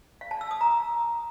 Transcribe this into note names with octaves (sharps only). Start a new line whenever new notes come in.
F5
A5
E6
D#6
A#5